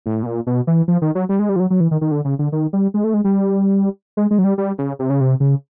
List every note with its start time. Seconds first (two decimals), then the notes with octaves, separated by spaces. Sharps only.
0.06 A2
0.23 B2
0.26 A#2
0.47 B2
0.67 E3
0.88 F3
1.02 D#3
1.15 F#3
1.29 G3
1.39 G#3
1.49 G3
1.56 F3
1.60 F#3
1.70 F#3
1.80 E3
1.91 D#3
2.01 D#3
2.11 D3
2.25 C#3
2.39 D3
2.52 D#3
2.73 G3
2.94 G#3
3.04 A3
3.14 G#3
3.24 G3
4.17 G#3
4.31 G#3
4.38 F#3
4.44 G3
4.58 G3
4.78 C#3
4.99 C3
5.10 C#3
5.21 C3
5.40 C#3